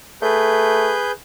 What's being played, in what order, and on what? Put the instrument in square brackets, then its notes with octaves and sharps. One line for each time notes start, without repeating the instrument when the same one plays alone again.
[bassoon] A3 [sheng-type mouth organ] G#4 B4 G6